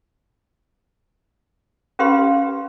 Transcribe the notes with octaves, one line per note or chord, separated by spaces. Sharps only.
C#4 F4 G4 B4 F5 C6